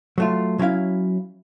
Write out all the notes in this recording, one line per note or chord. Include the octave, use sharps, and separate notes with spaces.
F#3 A3 F4
F#3 C#4 E4 F5